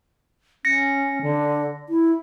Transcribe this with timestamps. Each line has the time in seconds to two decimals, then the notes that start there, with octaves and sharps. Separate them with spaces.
0.65 C#4 A#6 C#7
1.22 D3
1.89 E4